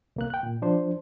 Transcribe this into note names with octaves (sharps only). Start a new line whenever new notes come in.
C2 A#3 F#6
G5 F#6
A#2
F3 D4 C5